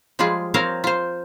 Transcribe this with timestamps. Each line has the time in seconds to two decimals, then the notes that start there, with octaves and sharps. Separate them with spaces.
0.19 F3 G3 G#3 F4 G#4
0.54 C4 A#4 C5 C#5 F5 A#5
0.84 F4 C5